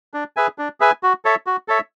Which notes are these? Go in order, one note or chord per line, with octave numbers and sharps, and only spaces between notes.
D4
G#4 B4 E5 G#5
D4
G#4 B4 E5 G#5
F#4
A4 C#5 E5
F#4
A4 C#5 E5